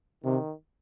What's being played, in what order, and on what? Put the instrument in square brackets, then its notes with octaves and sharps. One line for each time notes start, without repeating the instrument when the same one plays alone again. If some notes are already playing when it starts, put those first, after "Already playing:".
[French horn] C3 [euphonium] D#3